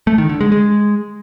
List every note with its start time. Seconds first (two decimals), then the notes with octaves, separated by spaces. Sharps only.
0.07 A3
0.18 D#3
0.29 D3
0.41 G#3
0.52 G#3